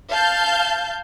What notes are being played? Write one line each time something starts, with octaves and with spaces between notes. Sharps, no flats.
F5 A5 G6